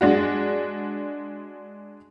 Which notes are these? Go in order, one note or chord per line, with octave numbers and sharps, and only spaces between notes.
G#3 D4 F#4